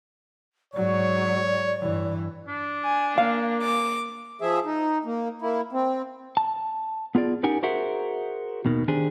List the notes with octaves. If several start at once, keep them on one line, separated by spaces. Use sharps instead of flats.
G#2 F#3 C#5 D5
G2 E3
D4
G#5
A#3 F5
D6
F3 G#4 E5
D#4
A#3
A#3 E4
C4
A5
B3 F4 G#4 D5
C#4 D#4 G4 A#4 F#5 G#5
F#4 G#4 A#4 C5 E5 F#5
D#2 B2 D#3
D#3 D4 G4 G#4 C5